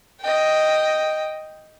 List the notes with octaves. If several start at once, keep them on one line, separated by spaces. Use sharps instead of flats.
D#5 G5